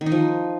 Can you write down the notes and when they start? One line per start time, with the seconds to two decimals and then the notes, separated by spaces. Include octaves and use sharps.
0.01 D#3
0.06 D#4
0.12 F3